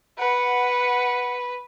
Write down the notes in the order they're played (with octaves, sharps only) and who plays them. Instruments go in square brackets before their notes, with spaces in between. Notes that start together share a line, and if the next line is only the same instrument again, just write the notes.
[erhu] B4 [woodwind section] F#5